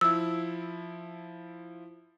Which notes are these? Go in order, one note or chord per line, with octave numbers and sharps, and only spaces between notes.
F3 E4 E6